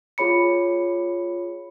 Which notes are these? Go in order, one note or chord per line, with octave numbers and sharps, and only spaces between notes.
F4 G#4 C#5 B5 C#7